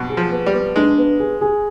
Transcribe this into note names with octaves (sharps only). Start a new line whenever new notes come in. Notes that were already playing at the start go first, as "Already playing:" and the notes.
Already playing: G2 B2
G#4
F3
B3
G3
B3
G#3 D4
B3
G#4
G#4